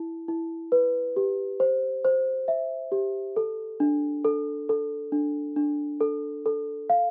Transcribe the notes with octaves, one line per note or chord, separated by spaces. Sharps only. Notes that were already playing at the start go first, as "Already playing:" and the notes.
Already playing: E4
E4
B4
G4
C5
C5
E5
G4
A4
D4
A4
A4
D4
D4
A4
A4
F5